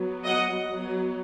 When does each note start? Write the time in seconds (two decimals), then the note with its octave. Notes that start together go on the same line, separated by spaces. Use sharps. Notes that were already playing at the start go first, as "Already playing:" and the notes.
Already playing: F#3 B3
0.26 D#5 F#5
0.66 F#3 B3